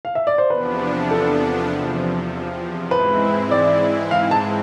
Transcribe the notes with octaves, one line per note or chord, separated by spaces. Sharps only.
F5
E5
D5
C5
E2 C3 F3 B3 D4 B4
A4
E2 C3 F3
G#2 E3 G#3 C4 E4 B4
D5
G#2 E3 G#3 C4 F5
A5